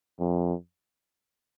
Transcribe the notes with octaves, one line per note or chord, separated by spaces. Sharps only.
F2